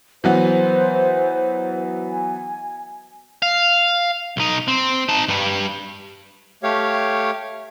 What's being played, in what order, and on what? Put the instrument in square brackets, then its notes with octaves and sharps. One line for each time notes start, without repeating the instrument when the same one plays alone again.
[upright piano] E3 F#3 B3 [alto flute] C5
[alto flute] G#5
[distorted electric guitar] F5
B1 D#4
C4
D#4 A5
G2 G3
[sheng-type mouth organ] A3 G4 C#5 F5